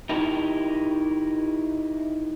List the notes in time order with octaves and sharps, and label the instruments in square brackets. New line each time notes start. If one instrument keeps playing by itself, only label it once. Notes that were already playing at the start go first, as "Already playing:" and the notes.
[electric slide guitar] D#4 E4 G4 A#4